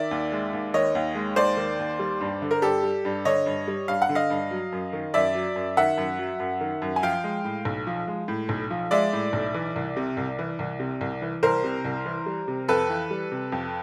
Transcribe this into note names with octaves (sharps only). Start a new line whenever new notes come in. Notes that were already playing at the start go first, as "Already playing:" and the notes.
Already playing: D#3 D5 E5
D#2
G#3
D#2
D#3 C#5 D#5
D#2
G#3
D#2 C5 D5
D#3
D#2
G3
G2
D3
A#4
G2 G4 A4
G3
G2
D3 C#5 D#5
G2
G3
G2 F5
F#5
D3
D#5 F5
G2
F#3
F#2
D#3
F#2 D5 E5
F#3
F#2
D#3 E5 F#5
F#2
F#3
F#2
D#3
F#2
G#5
F3 F5 G5
G#3
A2
B1
F3
G#3
A2
B1
F3
G#3 D5 E5
A2
B1
E3
C2
C3
C2
E3
C2
C3
C2
E3
C2 A#4 C5
C3
C2
E3
G3
C3
F2 A4 B4
E3
G3
C3
F2